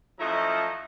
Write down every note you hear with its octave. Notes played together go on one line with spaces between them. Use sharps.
F#2 F3 A3 E4 D#5 A#5